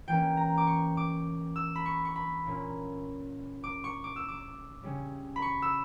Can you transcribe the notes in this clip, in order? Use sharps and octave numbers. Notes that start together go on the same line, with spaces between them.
E3 A#3 C#4 G5
A#5
D6
C#6
D6
E6
B5
C#6
C#6
B5
A#2 A#3 C#4
D6
C#6
D6
E6
D6
C#3 G3 C#4
B5
C#6
E6